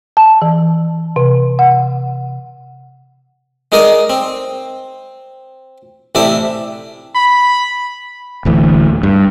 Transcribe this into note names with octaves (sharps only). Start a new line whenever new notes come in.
A5
E3
C3
F#5
G#3 D#4 A#4 D5 D#5
C4
A1 C3 E4 D5 A5
B5
D1 D2 E3
G2